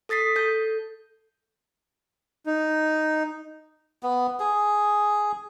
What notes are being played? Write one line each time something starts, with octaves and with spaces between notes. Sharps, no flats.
A4 D#6 A6 B6 C7
A4 G6
D#4
B3
G#4